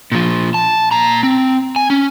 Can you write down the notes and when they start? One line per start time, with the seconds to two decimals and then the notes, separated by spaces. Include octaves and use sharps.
0.12 A#2 F3
0.54 A5
0.91 A#2 A#5
1.23 C4
1.76 G#5
1.90 C#4